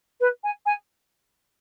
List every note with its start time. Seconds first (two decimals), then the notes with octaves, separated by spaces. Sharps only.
0.20 B4
0.43 G#5
0.66 G#5